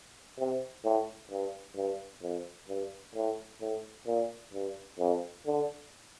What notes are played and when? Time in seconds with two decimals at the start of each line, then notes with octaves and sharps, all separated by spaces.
0.38 C3
0.84 A2
1.31 G2
1.76 G2
2.22 F2
2.68 G2
3.15 A2
3.61 A2
4.06 A#2
4.53 G2
4.99 F2
5.46 D3